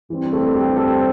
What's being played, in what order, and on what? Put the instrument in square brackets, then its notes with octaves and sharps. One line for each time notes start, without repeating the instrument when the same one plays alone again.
[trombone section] G2 G3 C4 [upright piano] E3
[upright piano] A3
G4
A4